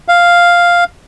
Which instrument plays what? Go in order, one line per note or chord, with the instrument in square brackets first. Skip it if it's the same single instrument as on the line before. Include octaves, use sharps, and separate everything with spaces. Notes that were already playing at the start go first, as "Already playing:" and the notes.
[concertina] F5